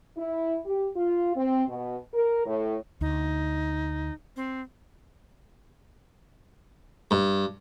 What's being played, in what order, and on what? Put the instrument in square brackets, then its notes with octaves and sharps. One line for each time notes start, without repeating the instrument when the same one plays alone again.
[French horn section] E4
G4
F4
C4
B2
A#4
A2
[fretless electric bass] D2 [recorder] D#4
[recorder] C4
[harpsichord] G2